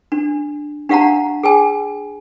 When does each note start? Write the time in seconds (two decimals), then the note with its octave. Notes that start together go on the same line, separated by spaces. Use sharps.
0.12 D4
0.89 D4 G4 F5 F#5 A5 A#5
1.43 G#4 G5 G#5